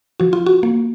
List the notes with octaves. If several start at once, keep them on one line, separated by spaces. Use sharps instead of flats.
F3 F#4
F4
F#4
A#3